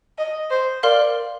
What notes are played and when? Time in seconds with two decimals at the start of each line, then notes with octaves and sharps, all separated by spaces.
0.18 D#5
0.51 C5
0.83 A#4 D5 F5 C6 F6